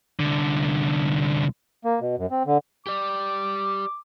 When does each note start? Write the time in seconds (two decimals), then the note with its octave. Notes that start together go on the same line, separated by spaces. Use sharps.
0.20 C2 D3
1.85 A#3
2.01 B2
2.18 F#2
2.31 C4
2.46 D3
2.87 G4 D5 D6